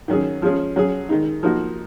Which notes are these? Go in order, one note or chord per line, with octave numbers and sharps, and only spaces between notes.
D#3 F#3 C#4 G#4
F3 G#3 C#4 G#4
F#3 C#4 G#4
D#3 G#3 D#4
F3 A#3 D#4 F#4